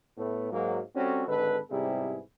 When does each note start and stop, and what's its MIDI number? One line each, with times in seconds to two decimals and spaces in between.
0.17 0.48 45
0.17 0.48 57
0.17 0.48 59
0.52 0.80 44
0.52 0.80 54
0.52 0.80 58
0.95 1.23 55
0.95 1.23 60
0.95 1.23 61
0.95 1.23 66
0.95 1.23 69
1.27 1.59 32
1.27 1.59 50
1.27 1.59 56
1.27 1.59 69
1.27 1.59 71
1.70 2.19 44
1.70 2.19 48
1.70 2.19 55
1.70 2.19 59
1.70 2.19 64
1.70 2.19 68